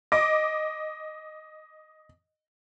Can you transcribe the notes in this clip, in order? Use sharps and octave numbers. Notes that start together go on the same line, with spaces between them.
D#5 D6